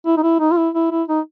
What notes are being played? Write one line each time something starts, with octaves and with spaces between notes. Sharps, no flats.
E4
D#4
E4
D#4
F4
E4
E4
E4
D#4